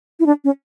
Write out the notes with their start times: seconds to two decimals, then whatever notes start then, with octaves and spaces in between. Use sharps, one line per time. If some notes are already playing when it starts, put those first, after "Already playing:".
0.20 E4
0.26 D4
0.44 C#4